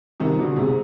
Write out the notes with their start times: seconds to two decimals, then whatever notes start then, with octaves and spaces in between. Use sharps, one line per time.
0.20 C3 D#3
0.38 B2 D3
0.56 G#2 C3